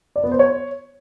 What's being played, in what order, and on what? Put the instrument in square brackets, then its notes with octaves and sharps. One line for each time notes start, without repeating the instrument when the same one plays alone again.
[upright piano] D5
B3
C5
C#5